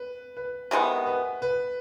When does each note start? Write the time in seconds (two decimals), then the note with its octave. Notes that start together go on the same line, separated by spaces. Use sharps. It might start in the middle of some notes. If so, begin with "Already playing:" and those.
Already playing: B4
0.37 B4
0.71 C3 D#3 G#3 B3
1.06 B4
1.42 B4